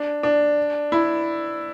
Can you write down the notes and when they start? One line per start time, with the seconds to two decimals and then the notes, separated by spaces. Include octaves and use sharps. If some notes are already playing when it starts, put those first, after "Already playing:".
Already playing: D4
0.23 D4
0.92 E4